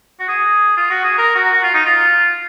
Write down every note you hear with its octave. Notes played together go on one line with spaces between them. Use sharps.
F#4
G#4
F4
F#4
G#4
A#4
F#4
F#4
F4
D#4
F4